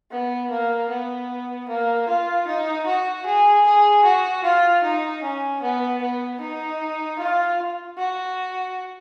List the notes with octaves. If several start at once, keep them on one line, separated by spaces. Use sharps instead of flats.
B3
A#3
B3
A#3
F4
D#4
F#4
G#4
G#4
F#4
F4
D#4
C#4
B3
B3
D#4
F4
F#4